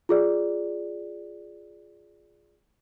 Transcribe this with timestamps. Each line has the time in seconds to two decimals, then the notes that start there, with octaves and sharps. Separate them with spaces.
0.09 F4 G#4 D5